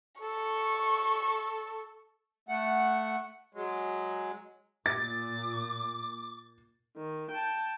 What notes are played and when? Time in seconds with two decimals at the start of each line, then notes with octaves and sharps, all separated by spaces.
0.21 A4 C#6
2.49 A3 F#5
3.54 F#3 G#3
4.86 A#2 D6 A6
6.97 D#3
7.32 G5 A5